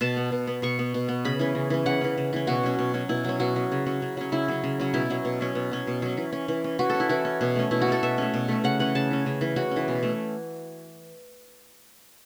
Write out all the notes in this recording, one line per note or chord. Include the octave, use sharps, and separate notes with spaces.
B2 A5
B3
B2
B3
B2 C#6
B3
B2
B3
C#3 B5
E3 C#4
C#3
E3 C#4
C#3 F#5
E3 C#4
C#3
E3 C#4
B2 F#4
F#3 C#4
B2
F#3 C#4
B2 E4
F#3 C#4
B2 F#4
F#3 C#4
C#3
F#3 C#4
C#3
F#3 C#4
C#3 E4
F#3 C#4
C#3
F#3 C#4
B2 E4
F#3 C#4
B2
F#3 C#4
B2
F#3 C#4
B2
F#3 C#4
E3
C#4
E3
C#4
E3 F#4
A4
C#4
E4
E3 F#4
C#4
B2
A3 C#4
B2 E4
F#4
A3 C#4 A4
B2 E5
A3 C#4
B2
A3 C#4
C#3 F#5
E3 C#4 F#5
C#3 A5
E3 C#4
C#3
E3 C#4
C#3 F#4
E3 C#4
B2
A3 C#4